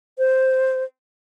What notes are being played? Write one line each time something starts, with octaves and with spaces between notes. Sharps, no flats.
C5